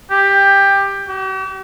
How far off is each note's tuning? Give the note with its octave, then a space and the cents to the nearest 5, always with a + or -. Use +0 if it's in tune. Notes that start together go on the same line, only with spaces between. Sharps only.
G4 +15
G4 -45